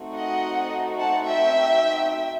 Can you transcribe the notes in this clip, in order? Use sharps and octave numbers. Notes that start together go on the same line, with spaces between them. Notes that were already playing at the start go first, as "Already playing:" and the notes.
Already playing: A3 C4 D#4 F#4
D#5 F#5
F#5 A5
E5 G5